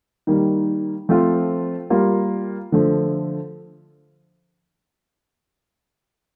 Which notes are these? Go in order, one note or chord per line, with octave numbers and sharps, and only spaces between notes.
D#3 G3 A#3
F3 A3 C4 F4
G3 A#3 F4
D3 F3 A3